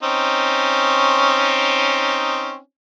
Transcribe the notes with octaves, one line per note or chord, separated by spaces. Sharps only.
C4 C#4 D#4